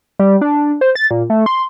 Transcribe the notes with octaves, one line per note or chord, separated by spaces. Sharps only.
G3
D4
C5
A6
A#2
A3
C6